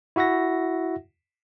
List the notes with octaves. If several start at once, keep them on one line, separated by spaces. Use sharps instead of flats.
E4 F#4 E5 F#5 A#6